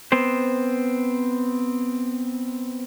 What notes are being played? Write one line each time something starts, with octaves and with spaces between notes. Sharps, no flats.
B3 C4 C5